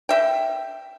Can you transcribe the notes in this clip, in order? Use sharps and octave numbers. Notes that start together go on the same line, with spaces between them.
E5 G5